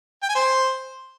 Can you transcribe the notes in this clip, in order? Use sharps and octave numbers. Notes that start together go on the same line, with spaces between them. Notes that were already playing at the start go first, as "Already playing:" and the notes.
G5
G#5
C5